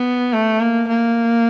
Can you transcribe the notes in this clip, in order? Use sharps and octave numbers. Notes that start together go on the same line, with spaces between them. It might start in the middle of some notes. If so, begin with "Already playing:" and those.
Already playing: B3
A3
A#3
A#3